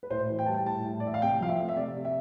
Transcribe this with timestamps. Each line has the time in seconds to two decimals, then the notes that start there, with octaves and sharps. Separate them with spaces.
0.03 B4
0.10 A2 C5
0.30 E3
0.39 G5
0.46 G3 A5
0.54 G5
0.66 A2 A5
0.85 A2
1.00 D5
1.04 E3 E5
1.14 F5
1.22 C3 G5
1.41 F3 F5
1.49 E5
1.59 A3
1.69 E5
1.77 C3 D5
1.96 C3
2.05 E5